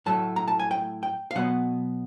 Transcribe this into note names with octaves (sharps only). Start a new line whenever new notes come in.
A2 F#3 A3 A5
A#5
A5
G#5
G5
G5
F5
B2 F#3 B3 F#5